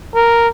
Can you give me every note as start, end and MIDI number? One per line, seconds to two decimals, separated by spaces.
0.14 0.48 70